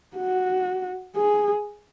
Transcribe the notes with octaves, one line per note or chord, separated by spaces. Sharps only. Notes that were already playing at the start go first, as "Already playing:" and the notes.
F#4
G#4